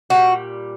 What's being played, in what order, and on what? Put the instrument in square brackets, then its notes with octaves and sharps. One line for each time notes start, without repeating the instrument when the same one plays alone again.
[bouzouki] A#2 G3 F#4